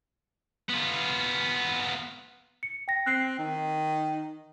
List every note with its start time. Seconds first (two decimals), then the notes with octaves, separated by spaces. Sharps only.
0.69 B3 F4
2.63 C#7
2.88 G5 A#6
3.06 C4 F#6 C7
3.38 D#3